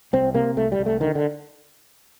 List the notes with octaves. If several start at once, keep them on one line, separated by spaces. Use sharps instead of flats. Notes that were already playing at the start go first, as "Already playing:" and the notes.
C2 C4
C3 A#3
C2 A3
G3
C2
A3
D3 D#3
D3